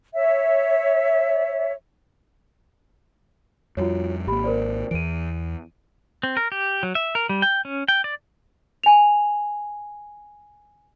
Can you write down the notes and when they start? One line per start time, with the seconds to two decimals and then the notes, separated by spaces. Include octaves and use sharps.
0.15 C#5 E5
3.77 F2 G3 F4 F#4 C#5
4.27 G#1 A#3 G4 B5
4.44 A#4 C5 D5
4.91 E2 E3 D7 D#7
6.23 C4
6.37 A#4
6.52 G4
6.83 F#3
6.95 E5
7.15 A#4
7.29 G3
7.42 G5
7.65 C#4
7.88 G5
8.04 D5
8.83 G#5 F7